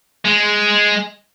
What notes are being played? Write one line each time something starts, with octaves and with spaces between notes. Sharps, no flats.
G#3